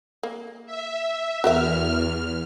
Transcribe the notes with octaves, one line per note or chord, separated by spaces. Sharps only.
A#3
E5
E2 F#4 A#4 E5 F6